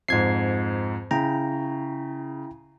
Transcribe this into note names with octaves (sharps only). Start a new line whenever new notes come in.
F2 G#2 G#6 C7
C#3 E4 G5 A#5